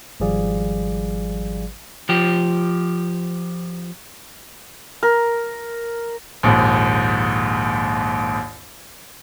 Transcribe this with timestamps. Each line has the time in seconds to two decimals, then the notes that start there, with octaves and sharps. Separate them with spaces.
0.20 G#1 F3 G3 G#4 D5 F5
2.09 F3 G4
5.03 A#4
6.43 A#1 D#2 G#2